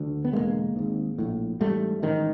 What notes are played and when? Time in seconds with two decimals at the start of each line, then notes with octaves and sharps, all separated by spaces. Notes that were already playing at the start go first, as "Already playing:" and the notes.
Already playing: D2 D3
0.25 B3
0.33 E1 D#2 D3 G#3 A#3
0.76 G#1 G#2
1.18 A#1 A2
1.60 A1 G#2 G3 A3
2.02 A1 G#2 D#3